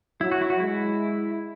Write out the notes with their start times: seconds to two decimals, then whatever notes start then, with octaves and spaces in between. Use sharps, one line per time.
0.21 F#3 E4
0.32 F#4
0.41 E4
0.50 F#4
0.60 G#3 E4